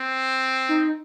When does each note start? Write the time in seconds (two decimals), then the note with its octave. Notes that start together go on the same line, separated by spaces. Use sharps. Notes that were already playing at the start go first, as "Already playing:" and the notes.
Already playing: C4
0.69 D#4